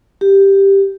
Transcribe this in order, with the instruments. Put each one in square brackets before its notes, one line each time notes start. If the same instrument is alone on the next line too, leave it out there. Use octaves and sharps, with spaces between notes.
[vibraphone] G4